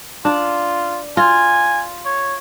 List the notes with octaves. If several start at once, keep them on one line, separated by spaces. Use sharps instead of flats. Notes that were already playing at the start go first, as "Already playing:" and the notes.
D4 F4
F4 G#5
C#5